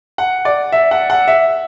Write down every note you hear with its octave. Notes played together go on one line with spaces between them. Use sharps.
F#5
D5
E5
F#5
F#5
E5